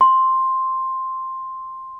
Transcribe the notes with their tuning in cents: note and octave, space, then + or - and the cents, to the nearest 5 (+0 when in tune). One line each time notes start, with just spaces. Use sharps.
C6 +5